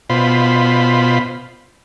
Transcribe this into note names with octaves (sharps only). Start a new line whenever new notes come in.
B2 F4 C5 B5